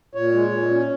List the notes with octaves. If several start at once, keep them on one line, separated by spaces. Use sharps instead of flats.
A#2 C#5
G#3
A#2
C#4